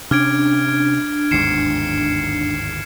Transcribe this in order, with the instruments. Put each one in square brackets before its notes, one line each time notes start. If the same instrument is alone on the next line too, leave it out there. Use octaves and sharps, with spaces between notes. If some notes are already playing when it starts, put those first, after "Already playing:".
[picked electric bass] C3 C#4 [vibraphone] D4 [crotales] F6 G#6 D7
[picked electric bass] G1 D#2 G#2 [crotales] C7 C#7 E7